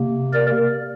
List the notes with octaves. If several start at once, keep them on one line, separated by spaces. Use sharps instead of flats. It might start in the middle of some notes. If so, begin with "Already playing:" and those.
Already playing: C3 A#3
A#4 D5